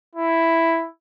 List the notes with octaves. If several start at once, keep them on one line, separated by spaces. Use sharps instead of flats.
E4